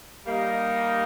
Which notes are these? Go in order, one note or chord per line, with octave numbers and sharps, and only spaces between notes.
G3 A#3 D#4